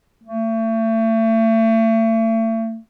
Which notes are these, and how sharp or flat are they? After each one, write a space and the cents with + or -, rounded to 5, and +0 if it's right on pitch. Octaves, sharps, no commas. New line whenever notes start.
A3 +35